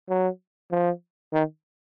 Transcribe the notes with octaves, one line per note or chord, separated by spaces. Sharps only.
F#3
F3
D#3